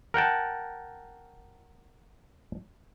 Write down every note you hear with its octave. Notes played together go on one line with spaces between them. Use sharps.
A#4 F#5 G5 A5